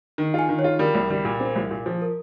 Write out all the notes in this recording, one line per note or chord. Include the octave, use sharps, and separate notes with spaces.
D#3
F4 G#5
D#3
C#5
F4
G3 A#4
C2
G3
A#2
C4
C2
A#2
F3
A#4